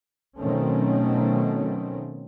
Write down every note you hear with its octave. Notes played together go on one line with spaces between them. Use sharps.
B2 D#3 F#3 A3 C4 C#4